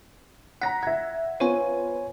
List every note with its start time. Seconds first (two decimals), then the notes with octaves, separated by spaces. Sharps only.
0.62 F#5 A#5 A#6 B6
0.83 E5 F#5 G#6
1.40 B3 F4 C5 C#5 G#5 D#7